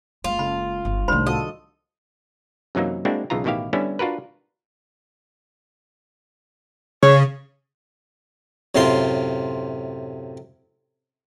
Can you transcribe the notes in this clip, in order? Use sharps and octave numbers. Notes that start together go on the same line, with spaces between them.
F#1 G#3 F4
C#3 A4 B5
G1
C2 A2 D#3 G3 D4 C5 B5 C6
F4 F#4 A4 D#5
F#2 C3 E3 F#3 A#3 D#4
G#3 A#3 C4 D4 E4 F#4
B1 C#3 E3 F4 A#5
A1 B2 D#3 E4 G4 F5
D3 G3 B3 C#4 E4
D4 F4 F#4 A#4 B4
C#3 C#5
F#2 A2 C3 F4 C6